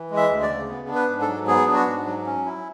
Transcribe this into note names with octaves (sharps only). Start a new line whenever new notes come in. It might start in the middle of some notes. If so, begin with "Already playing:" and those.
Already playing: E3
G#3
E5
D2
D5
C#3
B3
D4
B4
G#2
A4
F#3
B3 G#4
D4
F#4
G#2
F#3
C#4
E4